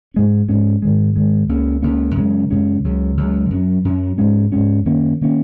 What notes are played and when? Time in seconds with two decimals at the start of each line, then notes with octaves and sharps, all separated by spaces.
0.14 G#2 G#3 C#4
0.49 G#2 G#3 C#4
0.82 G#2 D#3 G#3
1.16 G#2 D#3 G#3
1.49 C#2 C#3 A#3 C#4
1.82 C#2 C#3 A#3 C#4
2.17 F#2 C#3 G#3 C#4
2.51 F#2 C#3 G#3 C#4
2.84 C#2 C#3 F#3
3.17 C#2 C#3 F#3
3.50 F#2 F#3 C#4
3.85 F#2 F#3 C#4
4.18 G#2 G#3 C#4
4.52 G#2 G#3 C#4
4.85 F#2 D#3 A#3 C#4
5.21 D#3 A#3 C#4